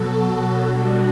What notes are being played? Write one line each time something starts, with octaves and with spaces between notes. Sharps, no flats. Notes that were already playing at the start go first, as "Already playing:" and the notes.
Already playing: B2 F#3 F#4 A4
B2 G3 D4 F#4